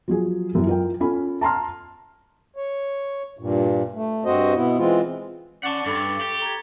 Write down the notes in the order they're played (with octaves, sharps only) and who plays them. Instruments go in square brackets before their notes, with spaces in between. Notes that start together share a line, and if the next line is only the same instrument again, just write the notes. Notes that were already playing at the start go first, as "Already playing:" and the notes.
[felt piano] F3 F#3 G#4
F#2 E4
F4 A#4 G5
C#4 F4 A4 B5
A5 A#5 C6 F6
[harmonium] C#5
G2 A#2
A3
G2 C4 F#4 C5 D#5
B2 B3 E4
E3 G#3 C4 F4
[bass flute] C#4 [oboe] D5 [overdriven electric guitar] F#5 A5 [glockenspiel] C#6 A6 C#7
[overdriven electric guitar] G2 [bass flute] A4 [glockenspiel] B5 A6 [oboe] D6
[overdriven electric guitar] G4 [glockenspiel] A6
[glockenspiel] A#5 G#6